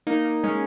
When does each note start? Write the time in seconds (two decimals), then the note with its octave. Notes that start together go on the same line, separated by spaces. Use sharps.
0.07 A#3 D#4
0.25 A#3
0.43 G#3 C#4